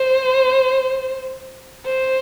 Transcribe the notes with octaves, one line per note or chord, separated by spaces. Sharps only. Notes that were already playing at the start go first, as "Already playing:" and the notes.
Already playing: C5
C5